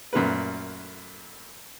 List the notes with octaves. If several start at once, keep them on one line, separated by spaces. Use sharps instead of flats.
F#2 A#2 A3 B4